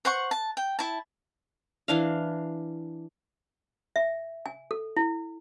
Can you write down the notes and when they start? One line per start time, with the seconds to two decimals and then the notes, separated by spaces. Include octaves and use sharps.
0.05 C5 F#5 C#6
0.31 A5
0.57 G5
0.79 E4 A5
1.88 E3 D4 F5
3.96 E5
4.46 G#5
4.71 A4
4.97 E4